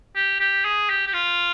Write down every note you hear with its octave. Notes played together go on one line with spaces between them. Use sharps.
G4
G4
G#4
G4
G4
F4